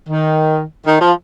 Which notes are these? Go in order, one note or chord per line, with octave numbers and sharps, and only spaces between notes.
D#3
D#3
F3